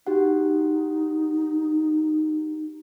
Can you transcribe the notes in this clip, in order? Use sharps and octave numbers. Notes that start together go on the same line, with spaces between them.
D#4 F#4 G4 F#5